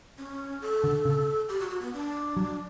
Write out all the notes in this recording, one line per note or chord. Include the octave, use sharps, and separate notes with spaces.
C#4
A4
D3
C#3
G4
F#4
F#4
B3
D4
F#3